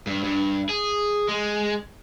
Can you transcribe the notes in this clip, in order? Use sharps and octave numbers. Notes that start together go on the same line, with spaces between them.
G2
G2
G#4
G#3